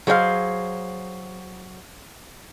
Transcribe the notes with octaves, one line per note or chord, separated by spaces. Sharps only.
F#3 G#4 C5 C#5 F5